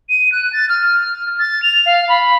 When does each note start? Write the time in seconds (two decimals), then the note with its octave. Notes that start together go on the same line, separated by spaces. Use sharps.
0.09 D#7
0.32 F#6
0.53 A6
0.69 F6
1.39 A6
1.62 F7
1.86 F5
2.09 B5